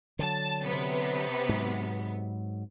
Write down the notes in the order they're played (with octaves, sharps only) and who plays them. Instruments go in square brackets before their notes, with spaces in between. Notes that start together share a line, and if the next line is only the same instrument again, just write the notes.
[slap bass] D3 F#3 [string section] A5
[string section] C3 B3
[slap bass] G#2 F#3